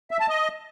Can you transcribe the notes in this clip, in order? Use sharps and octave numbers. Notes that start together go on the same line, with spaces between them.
E5
A5
D#5